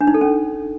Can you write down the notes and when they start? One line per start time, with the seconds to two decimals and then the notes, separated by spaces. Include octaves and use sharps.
0.01 D4
0.07 D#4
0.14 A4
0.21 C#4